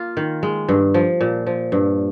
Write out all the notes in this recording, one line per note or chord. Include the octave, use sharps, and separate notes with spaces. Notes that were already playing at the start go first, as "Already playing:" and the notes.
Already playing: A#3 F4
D#3
G#3
G2
F3
A#2
F3
G2